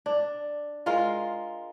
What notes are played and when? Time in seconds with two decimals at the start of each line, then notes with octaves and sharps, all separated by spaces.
0.06 D4
0.86 G#3 F4 A#4 F5